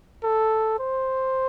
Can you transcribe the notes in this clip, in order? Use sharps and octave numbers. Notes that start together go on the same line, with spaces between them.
A4
C5